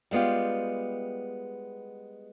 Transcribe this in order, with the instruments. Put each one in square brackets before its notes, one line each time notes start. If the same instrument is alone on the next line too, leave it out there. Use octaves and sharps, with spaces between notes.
[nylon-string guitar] G3 G#3 B3 F4 G4